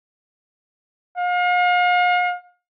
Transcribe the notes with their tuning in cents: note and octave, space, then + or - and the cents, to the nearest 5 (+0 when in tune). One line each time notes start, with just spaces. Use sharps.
F5 +40